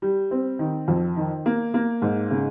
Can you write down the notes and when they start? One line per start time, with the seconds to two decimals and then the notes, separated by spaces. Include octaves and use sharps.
0.02 G3
0.31 C4
0.59 D#3
0.88 F2
1.16 D#3
1.46 A#3
1.74 A#3
2.02 G#2
2.31 C#3